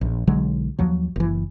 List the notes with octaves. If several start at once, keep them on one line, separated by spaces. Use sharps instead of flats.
A#1
B1 D3 F#3 G#3
D#2 F3 F#3
F#1 E3